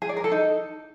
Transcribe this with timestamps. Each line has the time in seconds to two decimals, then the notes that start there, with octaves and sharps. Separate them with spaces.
0.02 G#4
0.09 D5
0.17 A#4
0.24 A4
0.32 D#4